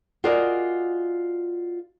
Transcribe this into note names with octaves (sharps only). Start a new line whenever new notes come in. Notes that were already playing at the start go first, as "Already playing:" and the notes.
F4 F#4 G#4 A#4 D5 D#5